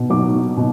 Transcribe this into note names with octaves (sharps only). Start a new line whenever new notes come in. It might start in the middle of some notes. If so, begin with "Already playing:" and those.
Already playing: B2
F#3 D6
B2